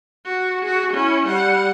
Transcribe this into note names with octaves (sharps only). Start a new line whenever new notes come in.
F#4
F#4 G#4
C#4 E4
G3 F#5